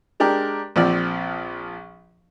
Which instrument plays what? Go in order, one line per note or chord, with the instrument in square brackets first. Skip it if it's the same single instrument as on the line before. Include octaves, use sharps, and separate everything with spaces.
[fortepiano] G#3 D4 G4 A#4
A#1 F3 C4 D5